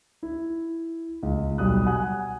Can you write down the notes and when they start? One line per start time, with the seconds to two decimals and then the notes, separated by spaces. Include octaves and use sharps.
0.23 E4
1.23 C#2
1.58 B1 G3 D#6 F#6
1.86 F#5 G#5 D#6 F#6